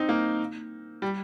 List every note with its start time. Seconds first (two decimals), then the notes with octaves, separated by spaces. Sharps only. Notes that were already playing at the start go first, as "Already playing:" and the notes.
Already playing: C4 D#4
0.09 A#3
1.02 G3